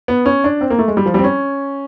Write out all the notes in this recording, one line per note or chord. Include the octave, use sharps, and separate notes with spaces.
B3
C#4
D4
C4
A#3
A3
G#3
G3
F3
G3
C4
C#4